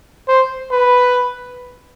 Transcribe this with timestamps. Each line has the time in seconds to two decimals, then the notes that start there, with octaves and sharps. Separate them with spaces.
0.28 C5
0.72 B4